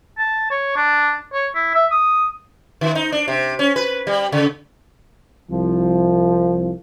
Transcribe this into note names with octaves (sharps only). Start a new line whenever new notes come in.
A5
C#5
D4
C#5
E4
E5
D#6
D#3
D#4
D4
C3
C#4
B4
G3
C#3
C2 F3